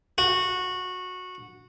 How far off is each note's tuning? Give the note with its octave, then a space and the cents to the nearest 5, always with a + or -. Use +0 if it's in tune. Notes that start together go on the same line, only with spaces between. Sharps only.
F#4 -15